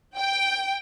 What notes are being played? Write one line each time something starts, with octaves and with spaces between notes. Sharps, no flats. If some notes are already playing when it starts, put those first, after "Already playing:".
G5